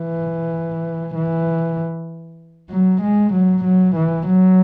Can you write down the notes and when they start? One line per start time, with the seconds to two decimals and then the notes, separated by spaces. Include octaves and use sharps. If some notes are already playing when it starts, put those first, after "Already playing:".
Already playing: E3
1.15 E3
2.70 F#3
3.02 G#3
3.33 F#3
3.64 F#3
3.96 E3
4.27 F#3